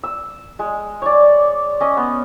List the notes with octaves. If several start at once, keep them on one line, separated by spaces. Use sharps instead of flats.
E6
G#3
C#5 D5
C#4 D#5
B3